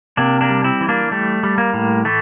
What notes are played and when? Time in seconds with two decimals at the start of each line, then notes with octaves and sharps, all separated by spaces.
0.17 C3 A#3 D4
0.41 A#3 D4
0.50 G3
0.64 C4 E4
0.81 E3
0.89 A#3 D4
1.11 G3 A3
1.43 G3
1.58 A#3
1.73 A2
2.05 E3 A3